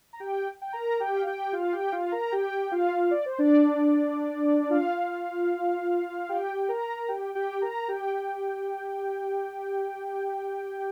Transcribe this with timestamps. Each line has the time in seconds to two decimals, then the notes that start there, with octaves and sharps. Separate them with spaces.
0.13 A#5
0.20 G4 G5
0.62 G5
0.73 A#4 A#5
1.00 G4 G5
1.15 F5
1.26 G4 G5
1.53 F4 F5
1.73 G4 G5
1.92 F4 F5
2.12 A#4 A#5
2.32 G4 G5
2.71 F4 F5
3.11 D5
3.26 C5
3.39 D4 D5
4.70 F4 F5
6.29 G4 G5
6.69 A#4 A#5
7.08 G4 G5
7.35 G4 G5
7.62 A#4 A#5
7.88 G4 G5